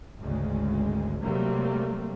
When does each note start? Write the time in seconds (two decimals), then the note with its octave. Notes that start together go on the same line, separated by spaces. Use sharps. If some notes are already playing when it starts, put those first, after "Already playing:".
0.20 G#1 D2 C#3 G#3
1.21 C3 F#3 G3 A3 A#3 C4